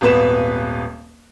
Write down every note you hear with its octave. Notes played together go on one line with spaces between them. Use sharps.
D#1 G#1 B3 B4 E7